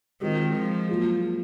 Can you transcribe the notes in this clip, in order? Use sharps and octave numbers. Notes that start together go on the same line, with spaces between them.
D#3 G#3 C4 F4
F3
F#3 A#3 F4 G#4